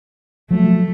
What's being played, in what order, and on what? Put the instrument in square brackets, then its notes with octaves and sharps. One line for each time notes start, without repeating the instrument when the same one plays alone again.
[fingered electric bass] F3 F#3 [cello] A3